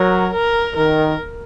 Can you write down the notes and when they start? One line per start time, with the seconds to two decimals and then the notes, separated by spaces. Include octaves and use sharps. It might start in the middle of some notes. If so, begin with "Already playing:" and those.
Already playing: F#3 A#4
0.34 A#4
0.75 D#3 A#4